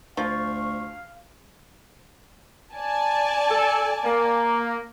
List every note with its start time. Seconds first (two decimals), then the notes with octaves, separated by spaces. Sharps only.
0.17 D2 F3 F5 C#6
2.74 D5 G#5 A5
3.50 A4
4.05 A#3